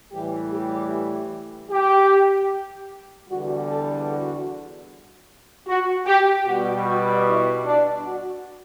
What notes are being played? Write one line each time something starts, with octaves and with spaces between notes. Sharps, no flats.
A2 E3 G3 G4
G4
G4
E2 D3 G3 F#4
A4
F#4
F#4
G4
B2 G3 F#4
F#4
E4
D4
F#4